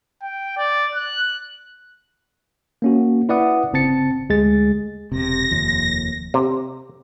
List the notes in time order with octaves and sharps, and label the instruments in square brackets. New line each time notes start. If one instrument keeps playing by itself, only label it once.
[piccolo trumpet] G5
D5
F#6
[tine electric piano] A#3 C#4 F#4
E4 B4 D5 E5 F#5 D#6
G1 C#3 C4 A5 A6 C#7
D2 G#3 G#4 A6
[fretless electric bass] E1 C3 [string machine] A#6
[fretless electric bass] F1 D#2 F3
[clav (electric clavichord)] C3